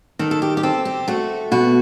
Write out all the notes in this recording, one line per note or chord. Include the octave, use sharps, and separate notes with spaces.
D#3 A4
A4
G4
G4
C4 A4
G4
A3 F#4
B2 F#4